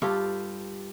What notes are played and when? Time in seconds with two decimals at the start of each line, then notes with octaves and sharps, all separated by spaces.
0.02 G2 F4 G4 A4